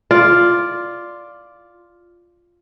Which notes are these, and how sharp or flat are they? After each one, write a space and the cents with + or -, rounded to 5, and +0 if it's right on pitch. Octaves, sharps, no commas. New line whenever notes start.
F4 +0 D5 +0